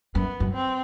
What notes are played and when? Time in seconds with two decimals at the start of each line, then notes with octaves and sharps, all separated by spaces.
0.15 F#2 B3
0.40 F#2
0.54 C4